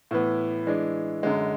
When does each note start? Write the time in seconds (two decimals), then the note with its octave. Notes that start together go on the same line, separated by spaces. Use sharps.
0.11 A2 E3 B3
0.67 E3 G#3 D4
1.23 F#2 D3 G#3